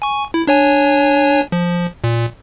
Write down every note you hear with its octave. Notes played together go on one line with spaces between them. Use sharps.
G#5 C#6
E4
D4 C#5 G#5
F3
A#2